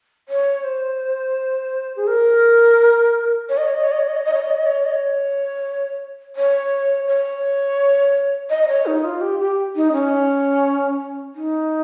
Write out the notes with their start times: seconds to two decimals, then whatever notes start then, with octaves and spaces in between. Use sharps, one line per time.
0.29 C#5
0.64 C5
1.96 G#4
2.07 A#4
3.49 C#5
3.58 D#5
3.67 C#5
3.75 D#5
3.84 C#5
3.92 D#5
3.99 C#5
4.08 D#5
4.17 C#5
4.25 D#5
4.34 C#5
4.41 D#5
4.51 C#5
4.58 D#5
4.66 C#5
4.85 D#5
4.92 C#5
6.36 C#5
7.07 C#5
8.50 D#5
8.63 D#5
8.68 C#5
8.86 D#4
9.04 F4
9.21 G4
9.40 G4
9.76 D#4
9.93 C#4
11.35 D#4